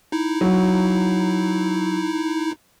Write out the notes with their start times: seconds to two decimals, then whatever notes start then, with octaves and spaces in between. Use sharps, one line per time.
0.12 D#4 E4
0.41 F#3